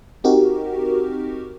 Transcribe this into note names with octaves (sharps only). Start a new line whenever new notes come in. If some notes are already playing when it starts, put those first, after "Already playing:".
C4 D#4 F#4 G4 A#4